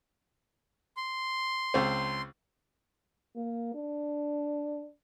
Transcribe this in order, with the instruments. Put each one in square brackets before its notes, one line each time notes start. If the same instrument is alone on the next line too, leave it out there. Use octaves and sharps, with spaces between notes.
[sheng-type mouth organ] C6
[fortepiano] C#2 C4
[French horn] A#3
D4